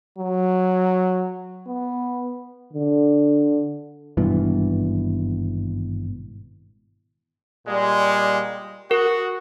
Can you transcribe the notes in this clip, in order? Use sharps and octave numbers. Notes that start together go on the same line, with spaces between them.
F#3
B3
D3
G#1 G2 B2 E3
A#2 G3 G#3
F#4 A#4